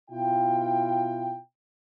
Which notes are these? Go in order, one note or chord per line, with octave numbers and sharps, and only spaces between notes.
B2 E4 F4 G5